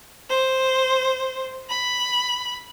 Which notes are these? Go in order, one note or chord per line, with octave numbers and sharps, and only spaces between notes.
C5
B5